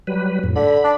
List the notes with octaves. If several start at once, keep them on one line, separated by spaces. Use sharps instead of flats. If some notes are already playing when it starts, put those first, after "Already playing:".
F#3 G3 B4
F2 A2
D3 B5
D4